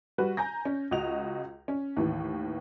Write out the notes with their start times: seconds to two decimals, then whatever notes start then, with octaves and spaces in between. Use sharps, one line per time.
0.18 G3 F#4 B4
0.37 G#5 A#5 G6 A#6
0.65 C#4
0.91 C#2 F#4 D#5 F7
1.68 C#4
1.97 D#2 A2 E3